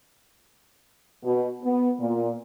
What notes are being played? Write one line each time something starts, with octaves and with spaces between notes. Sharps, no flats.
B2
B3
A#2